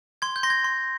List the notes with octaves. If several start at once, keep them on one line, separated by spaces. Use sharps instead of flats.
C6 G#6
G6
C6 A#6
G#6
C6